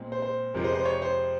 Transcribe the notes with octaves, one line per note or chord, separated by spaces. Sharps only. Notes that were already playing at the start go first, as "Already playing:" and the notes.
Already playing: A#2 G#3 C4
C5
C5
F2 C3 F3 G#3 A#4
C5
C5
C#5
C5